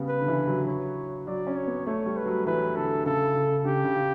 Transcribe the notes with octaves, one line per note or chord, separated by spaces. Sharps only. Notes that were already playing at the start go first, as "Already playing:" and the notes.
Already playing: C#3 G3 B3
B4
D3
E3
F#3
C#5
F#3 D5
C#4
C#5
B3
A3 C#5
G3
B4
F#3
E3 B4
D3 A4
C#3 A4
C#3
C#3 G4
C#3
C#3